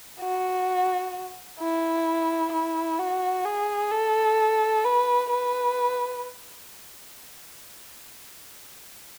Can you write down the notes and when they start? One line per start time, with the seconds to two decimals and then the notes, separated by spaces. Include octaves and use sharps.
0.21 F#4
1.60 E4
2.52 E4
2.99 F#4
3.45 G#4
3.92 A4
4.84 B4
5.30 B4